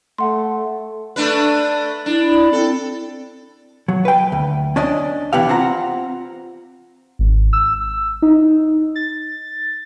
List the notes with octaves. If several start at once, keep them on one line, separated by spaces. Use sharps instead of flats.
A3 F#5 C6
A3 D4 B4
D4 E4
C4 A4
F#3
B4 G5
D2
C#4 D4 D5 D#5
C2 E3 B3 G4 F5
C4 F4 F#5 A#5
G#1
E6
D#4
A6